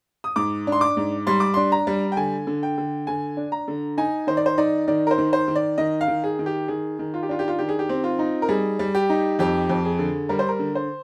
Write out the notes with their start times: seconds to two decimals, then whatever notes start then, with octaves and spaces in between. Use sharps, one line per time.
0.24 D#6
0.36 G#2 D6
0.67 D4
0.72 C6
0.81 D6
0.97 G#2
1.27 G3 C6
1.40 D6
1.54 D4 C6
1.72 A#5
1.87 G3
2.12 G5
2.17 D3 G#5
2.47 D3
2.63 G5
2.78 D3
3.07 D3 G#5
3.37 D4
3.52 A#5
3.68 D3
3.97 D#4 G#5
4.27 D#3 C5
4.37 D5
4.46 C5
4.58 D#4 D5
4.88 D#3 D5
5.07 A#4
5.11 C5
5.18 D#3
5.33 C5
5.48 D#3
5.56 D5
5.78 D#3 D#5
6.01 F5
6.08 D#3
6.24 G#4
6.39 D#3
6.46 G4
6.68 D#3 G#4
6.99 D#3
7.14 F4
7.23 G4
7.29 D4 F4
7.39 G4
7.48 F4
7.59 D#3 G4
7.69 G#4
7.79 G4
7.89 C4
8.04 F4
8.19 D#4
8.42 A#4
8.49 G3 G#4
8.79 G3
8.95 G4
9.10 D#4
9.39 F2 G4
9.69 F2
9.85 G#4
9.99 D3
10.29 G3 A#4
10.39 C5
10.49 A#4
10.59 D3
10.75 C5